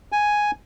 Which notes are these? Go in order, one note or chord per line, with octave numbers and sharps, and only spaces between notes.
G#5